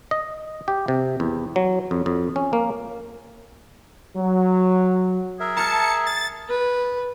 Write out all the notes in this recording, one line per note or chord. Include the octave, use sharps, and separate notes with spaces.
D#5
G4
C3
E2
F#3
F2
F2
C#4
A#3
F#3
G#4 A#4 E5
A5 A#5 F6 C#7
A6
B4